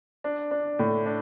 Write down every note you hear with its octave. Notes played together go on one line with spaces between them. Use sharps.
D4
D4
A2
D4